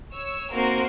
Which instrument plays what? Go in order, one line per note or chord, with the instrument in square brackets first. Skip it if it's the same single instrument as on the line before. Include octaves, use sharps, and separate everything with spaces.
[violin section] C#5 E6
A#3 C4 D#4 F#4 A#4 C5